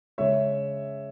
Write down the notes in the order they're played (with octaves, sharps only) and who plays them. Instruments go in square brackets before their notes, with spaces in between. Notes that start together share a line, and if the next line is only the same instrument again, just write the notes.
[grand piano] C#3 G#3 C#4 C#5 E5